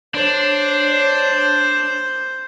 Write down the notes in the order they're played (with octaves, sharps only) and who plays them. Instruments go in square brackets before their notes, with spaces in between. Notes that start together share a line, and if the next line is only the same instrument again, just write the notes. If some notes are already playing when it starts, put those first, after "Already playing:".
[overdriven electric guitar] D4 [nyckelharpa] C5 [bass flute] C#5